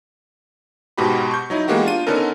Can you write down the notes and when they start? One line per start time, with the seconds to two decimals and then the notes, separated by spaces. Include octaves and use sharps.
0.98 G#2 B2 F#4 G4 B5
1.31 C#6 G6
1.50 F#3 D#4 E4
1.68 E3 G#3 A#3 B3 F#4 G4
1.84 D4 F4 D#7
2.07 D3 B3 C#4 D#4 A4 A#4